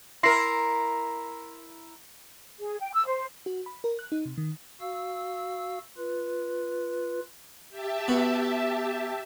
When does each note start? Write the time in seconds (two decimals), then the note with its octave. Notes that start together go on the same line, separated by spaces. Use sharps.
0.23 E4 A#4 C6 A#6 C7
2.60 G#4
2.80 G5
2.93 E6
3.06 C5
3.46 F#4
3.66 B5
3.84 A#4
3.99 F#6
4.12 D#4
4.26 C3
4.38 D#3
4.80 F#4 F5 E6
5.98 F4 B4
7.69 G4 E5 A5
8.08 B3 F#4